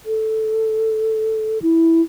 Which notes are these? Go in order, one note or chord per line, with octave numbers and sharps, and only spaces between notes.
A4
E4